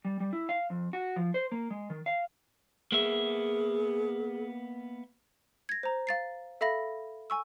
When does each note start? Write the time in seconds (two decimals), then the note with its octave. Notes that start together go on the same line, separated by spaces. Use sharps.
0.05 G3
0.20 G3
0.33 E4
0.49 F5
0.70 F2
0.93 F#4
1.16 F3
1.34 C5
1.52 A#3
1.71 G#3
1.90 D#3
2.06 F5
2.92 A#3 B3 G#4 E5
5.69 G#6 A#6
5.83 C5 A#5
6.07 F5 A6 C7
6.61 A4 E5 F5 B5 A#6
7.30 G#5 C#6 E6